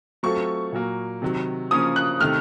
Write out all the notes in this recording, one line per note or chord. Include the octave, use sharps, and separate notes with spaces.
F#3 A3 C4 F4 A4 C#6
A#2 F#3 A#3
C3 D#3 F#3
C#3 F3 A#3 C#4 D#6
F#6
C3 D#3 A3 F6